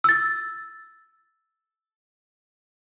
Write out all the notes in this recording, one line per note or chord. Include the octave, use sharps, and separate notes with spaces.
E6 A6